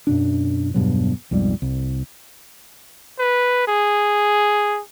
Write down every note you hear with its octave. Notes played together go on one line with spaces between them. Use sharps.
F#2 B2 D4
E2 G2 B2 F#3
B1 F2 G#2 G3
C2
B4
G#4